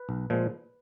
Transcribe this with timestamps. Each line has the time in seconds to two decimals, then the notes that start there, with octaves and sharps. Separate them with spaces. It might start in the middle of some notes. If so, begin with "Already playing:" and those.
Already playing: B4
0.09 B1
0.30 A#2 F3 G#3